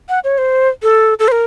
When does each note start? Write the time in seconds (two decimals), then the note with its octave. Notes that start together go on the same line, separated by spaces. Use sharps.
0.09 F#5
0.24 C#5
0.38 C5
0.83 A4
1.19 A4
1.28 C5
1.32 A#4